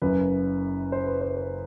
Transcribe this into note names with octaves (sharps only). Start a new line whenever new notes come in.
F#1 F#2 C#3 B4
C5
B4
C5
C5